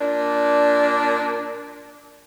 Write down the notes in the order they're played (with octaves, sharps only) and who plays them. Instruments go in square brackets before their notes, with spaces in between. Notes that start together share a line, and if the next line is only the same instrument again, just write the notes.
[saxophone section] A#2 D4